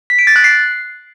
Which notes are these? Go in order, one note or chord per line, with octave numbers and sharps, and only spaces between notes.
B6
D7
A6
F#6
C7